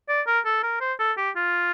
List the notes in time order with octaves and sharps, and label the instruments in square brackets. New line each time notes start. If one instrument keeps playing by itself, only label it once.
[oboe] D5
A#4
A4
A#4
C5
A4
G4
F4